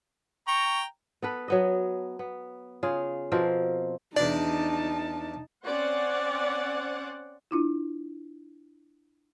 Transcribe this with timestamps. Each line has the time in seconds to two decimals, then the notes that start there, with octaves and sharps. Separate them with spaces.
0.48 G5 A#5 C#6
1.22 B3 A4 B4
1.48 F#3 B3 D#5
2.19 B3
2.83 C#3 F4 G#4
3.32 B2 F3 C4 A#4
4.16 E2 D4 D#4 D5 A5
5.64 C4 C#4 C5 D5 F#5
7.51 D4 E4 F4